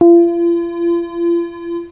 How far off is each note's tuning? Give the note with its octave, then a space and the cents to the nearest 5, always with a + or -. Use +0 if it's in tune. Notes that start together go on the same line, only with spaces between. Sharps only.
F4 -40